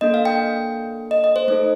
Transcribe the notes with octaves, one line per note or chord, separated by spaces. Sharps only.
A#3 D4 A4 D#5
F5
G5
D#5
D#5
C5
A3 D#4 A4 C5